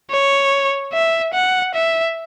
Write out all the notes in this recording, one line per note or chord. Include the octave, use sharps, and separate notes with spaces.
C#5
E5
F#5
E5